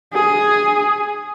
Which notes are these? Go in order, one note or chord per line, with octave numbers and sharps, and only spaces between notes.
G#4